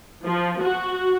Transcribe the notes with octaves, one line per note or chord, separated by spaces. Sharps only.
F3
F#4